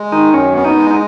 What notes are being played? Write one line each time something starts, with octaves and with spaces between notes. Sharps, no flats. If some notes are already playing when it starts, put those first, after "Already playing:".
Already playing: G#3
D#3 D#4
F#2 C#4
B3 C#4
D#4
G#3
D#4